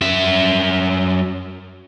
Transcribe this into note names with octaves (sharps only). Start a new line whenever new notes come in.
F#2 E5